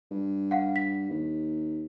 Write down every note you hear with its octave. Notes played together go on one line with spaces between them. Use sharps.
G2
F5 F#5
B6
D#2